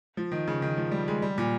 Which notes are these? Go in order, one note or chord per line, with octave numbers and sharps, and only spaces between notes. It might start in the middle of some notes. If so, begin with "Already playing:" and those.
F3
D#3
C#3
D#3
F3
G3
G#3
G3
A#2